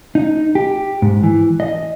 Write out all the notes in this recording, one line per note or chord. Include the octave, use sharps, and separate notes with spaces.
D#4
G4
G#2
E3
D#5